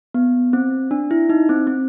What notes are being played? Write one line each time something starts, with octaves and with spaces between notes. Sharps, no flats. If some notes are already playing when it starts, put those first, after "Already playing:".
B3
C4
D4
E4
D#4
C4
C4